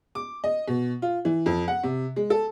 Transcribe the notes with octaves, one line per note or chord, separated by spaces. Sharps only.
D6
D#5
B2
F4
E3
F2
F#5
C3
G#3
A4